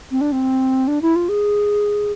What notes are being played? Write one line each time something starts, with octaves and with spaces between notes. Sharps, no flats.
C4
D4
C4
D4
E4
F4
G#4